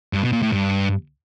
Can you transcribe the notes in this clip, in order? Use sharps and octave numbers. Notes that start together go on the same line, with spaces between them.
G2
B2
A#2
A2
G2